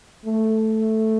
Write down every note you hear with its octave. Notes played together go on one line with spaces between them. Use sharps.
A3